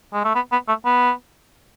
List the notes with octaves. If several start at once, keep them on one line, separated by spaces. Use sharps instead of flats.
G#3
A3
B3
B3
A3
B3